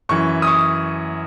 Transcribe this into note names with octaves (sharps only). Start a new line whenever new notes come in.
F#2 E3 C#6
D#6
C#6